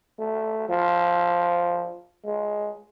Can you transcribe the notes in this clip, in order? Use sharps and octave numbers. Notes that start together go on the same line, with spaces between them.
A3
F3
G#3